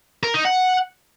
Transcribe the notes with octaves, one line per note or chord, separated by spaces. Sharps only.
A#4
D#4
F#5